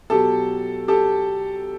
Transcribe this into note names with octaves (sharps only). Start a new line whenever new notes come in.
B2 F#3 G4 A4
G4 A4